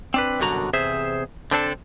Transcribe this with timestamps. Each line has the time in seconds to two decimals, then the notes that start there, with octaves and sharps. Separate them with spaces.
0.14 C4 D4 B4
0.40 C2 F#2 B2 D3 F#4 A#5
0.73 E2 C3 G#4 C5 E5
1.51 D3 C4 D4 A4